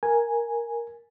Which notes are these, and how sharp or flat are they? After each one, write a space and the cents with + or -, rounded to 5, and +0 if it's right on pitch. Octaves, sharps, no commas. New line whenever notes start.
A#4 +0 G#5 +0